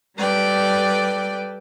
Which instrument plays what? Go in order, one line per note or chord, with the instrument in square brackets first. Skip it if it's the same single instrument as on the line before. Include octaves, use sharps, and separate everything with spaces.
[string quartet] G3 A4 B4 D5 G5